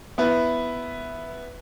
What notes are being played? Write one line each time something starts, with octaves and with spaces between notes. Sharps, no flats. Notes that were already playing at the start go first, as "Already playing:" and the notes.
B3 E4 B4